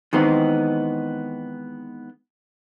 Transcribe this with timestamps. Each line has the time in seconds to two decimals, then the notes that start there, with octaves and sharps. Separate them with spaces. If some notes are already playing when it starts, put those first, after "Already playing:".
0.13 D#3 E3 G#3 B3 C4